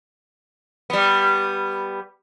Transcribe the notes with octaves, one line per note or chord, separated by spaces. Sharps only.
G3 B3